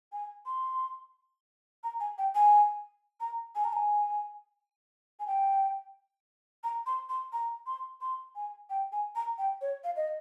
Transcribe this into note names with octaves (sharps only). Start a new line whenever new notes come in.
G#5
C6
A#5
G#5
G5
G#5
A#5
G#5
A#5
G#5
G#5
G5
A#5
C6
C6
A#5
C6
C6
G#5
G5
G#5
A#5
G5
C#5
F5
D#5